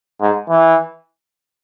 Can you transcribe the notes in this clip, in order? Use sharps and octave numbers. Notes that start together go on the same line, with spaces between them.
G#2
E3